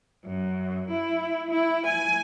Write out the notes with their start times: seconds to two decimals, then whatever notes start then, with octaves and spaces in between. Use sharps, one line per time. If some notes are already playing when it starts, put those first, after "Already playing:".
0.24 F#2
0.89 E4
1.49 E4
1.87 G#5